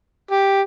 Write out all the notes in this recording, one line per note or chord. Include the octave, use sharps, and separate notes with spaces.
G4